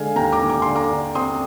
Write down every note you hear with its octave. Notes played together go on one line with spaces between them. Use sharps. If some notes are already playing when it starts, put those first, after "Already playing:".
Already playing: D3 G#3 F5 G#5
D#2 G5 A#5
A#5 D6
D#2
D6
D3 C6
A#5 D6
D3
C4 C6 D#6